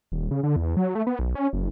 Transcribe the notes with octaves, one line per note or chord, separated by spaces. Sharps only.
D#1
C#3
D3
E2
F#3
A3
B3
B1
C#4
F#1